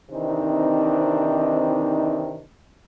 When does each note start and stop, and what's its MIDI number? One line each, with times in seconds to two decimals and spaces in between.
0.10 2.41 48
0.10 2.41 51
0.10 2.41 52
0.10 2.41 60
0.10 2.41 62
0.10 2.41 63